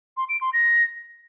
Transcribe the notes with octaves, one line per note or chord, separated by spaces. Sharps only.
C6
D7
C6
A#6